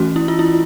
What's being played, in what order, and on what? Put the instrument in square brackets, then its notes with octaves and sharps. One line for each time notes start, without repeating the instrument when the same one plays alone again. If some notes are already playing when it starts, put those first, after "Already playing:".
Already playing: [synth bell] E3 A3 C#4 F#4
E4
F4
E4